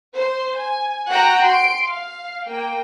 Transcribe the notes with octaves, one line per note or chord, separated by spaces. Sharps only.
C5 C6
G#5
F#4 F#5 G5 A#5 F#6
C6 D7
F5
A#3 G5